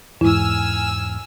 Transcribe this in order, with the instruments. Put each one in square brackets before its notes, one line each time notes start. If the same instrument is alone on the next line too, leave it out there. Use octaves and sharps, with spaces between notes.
[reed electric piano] E2 G#2 [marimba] E4 [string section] G#5 E6 F6